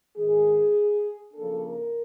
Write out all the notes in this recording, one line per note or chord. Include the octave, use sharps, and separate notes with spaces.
G#2 D#3 G#3 G#4
C#3 F3 A#3 D4 A4
A#4